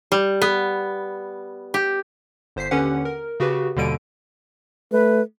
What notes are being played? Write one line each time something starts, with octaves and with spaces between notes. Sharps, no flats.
G3
B3
G4
G1 C5 B6 C7
D#2 D3 C#4 G4 B4 F#5
A#4
C#3 F#4 G4 B4
D#2 B2 D3 G3 D7 D#7
A3 B4